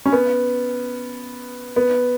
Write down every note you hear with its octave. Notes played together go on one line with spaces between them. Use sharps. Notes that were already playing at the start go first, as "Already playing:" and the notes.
C#4
B3
B3